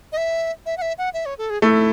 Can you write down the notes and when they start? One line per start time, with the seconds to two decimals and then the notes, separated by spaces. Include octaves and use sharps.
0.12 D#5
0.17 E5
0.66 E5
0.78 F#5
0.82 E5
0.98 F#5
1.14 E5
1.26 C#5
1.38 A4
1.50 G#4
1.62 A3 E4